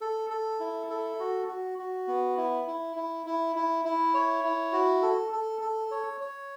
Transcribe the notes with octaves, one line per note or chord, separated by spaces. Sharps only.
A4
A4
E4
A4
F#4
F#4
F#4
B3
E4
E4
E4
E4
E4
E4
C#5
E4
F#4
A4
A4
A4
C#5
C#5